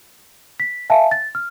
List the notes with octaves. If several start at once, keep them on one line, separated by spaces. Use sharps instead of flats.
B6
E5 F5 G#5 A5
A6
F6